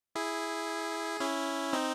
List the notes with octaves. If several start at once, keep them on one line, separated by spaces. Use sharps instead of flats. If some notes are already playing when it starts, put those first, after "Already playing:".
E4 G#4
C#4 E4
C4 D#4